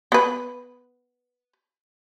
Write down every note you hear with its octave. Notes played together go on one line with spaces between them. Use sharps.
B3 B4